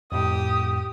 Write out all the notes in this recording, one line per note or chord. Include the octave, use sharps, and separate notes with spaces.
F2 A2 G4 D#6